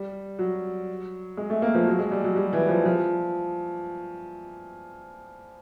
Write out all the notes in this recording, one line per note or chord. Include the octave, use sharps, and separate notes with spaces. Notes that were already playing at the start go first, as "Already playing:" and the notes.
Already playing: G3
F#3
G#3
A3
A#3
F3
F#3
G#3
G3
F#3
G3
E3
F3
F3